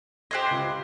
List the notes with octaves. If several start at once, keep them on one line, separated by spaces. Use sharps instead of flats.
G4 C5 D#5 F#6 G#6
C#2 C7